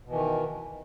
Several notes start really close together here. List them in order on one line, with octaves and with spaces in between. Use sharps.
B2 E3 D#3